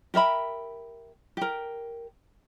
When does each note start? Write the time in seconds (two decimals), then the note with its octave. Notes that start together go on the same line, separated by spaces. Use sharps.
0.14 G4 A#4 E5 B5
1.37 G4 A#4